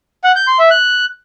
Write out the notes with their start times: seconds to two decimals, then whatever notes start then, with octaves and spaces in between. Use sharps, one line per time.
0.24 F#5
0.36 G6
0.47 C6
0.59 E5
0.71 F#6